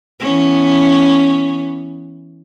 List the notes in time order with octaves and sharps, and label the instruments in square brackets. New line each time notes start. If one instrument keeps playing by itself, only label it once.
[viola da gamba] E3 B3 C#4